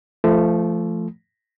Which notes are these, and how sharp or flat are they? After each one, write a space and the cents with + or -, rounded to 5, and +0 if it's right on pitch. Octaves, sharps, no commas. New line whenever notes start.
F3 -25 A3 +0